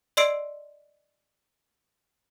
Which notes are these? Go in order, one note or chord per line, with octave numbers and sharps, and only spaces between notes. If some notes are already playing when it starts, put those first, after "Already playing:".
D5 D#5 C6 E6 C7 D7